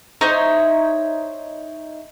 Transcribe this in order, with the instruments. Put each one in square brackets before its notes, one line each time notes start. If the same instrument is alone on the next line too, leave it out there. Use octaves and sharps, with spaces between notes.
[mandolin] D#4 E4 C5 C#5